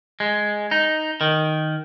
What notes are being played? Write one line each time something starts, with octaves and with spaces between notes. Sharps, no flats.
G#3
D#4
D#3